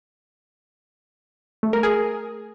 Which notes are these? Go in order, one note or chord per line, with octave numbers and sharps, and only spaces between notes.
A3
A#4
G#4